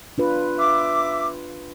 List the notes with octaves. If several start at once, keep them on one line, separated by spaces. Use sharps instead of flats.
D4 F4 B4
E5 D6